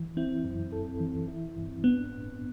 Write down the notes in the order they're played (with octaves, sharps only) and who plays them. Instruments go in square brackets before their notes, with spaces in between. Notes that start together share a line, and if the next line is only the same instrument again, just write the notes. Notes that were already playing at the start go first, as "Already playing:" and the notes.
Already playing: [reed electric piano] E3
[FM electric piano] C4 [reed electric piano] E4
[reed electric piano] F#2
A4
E3
E4
G2
[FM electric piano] B3 [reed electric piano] D4
[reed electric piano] A2